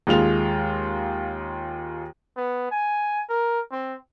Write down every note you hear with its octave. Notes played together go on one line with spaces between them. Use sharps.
D#2 G#3 F4 F7
B3
G#5
A#4
C4